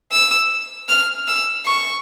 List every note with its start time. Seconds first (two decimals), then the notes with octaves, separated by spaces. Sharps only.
0.12 E6
0.89 F6
1.28 E6
1.66 C#6